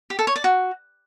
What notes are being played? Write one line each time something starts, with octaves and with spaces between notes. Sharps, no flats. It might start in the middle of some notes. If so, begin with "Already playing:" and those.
G4
A4
C#5
D5
F#4